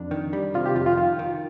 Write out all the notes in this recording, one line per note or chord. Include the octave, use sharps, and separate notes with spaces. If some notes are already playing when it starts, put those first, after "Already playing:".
Already playing: F2 D4
D#3
G3
C3 F4
G4
F2 F4
F4
D#3 F4
D#3